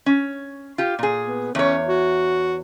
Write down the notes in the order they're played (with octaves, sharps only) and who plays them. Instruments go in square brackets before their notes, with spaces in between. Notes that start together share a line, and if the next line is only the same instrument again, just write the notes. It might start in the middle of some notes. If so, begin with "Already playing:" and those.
[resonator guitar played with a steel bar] C#4
F4 G4
A#2 G#4
[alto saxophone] B3
[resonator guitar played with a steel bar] E2 C#5 [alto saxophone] C#4
[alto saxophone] F#4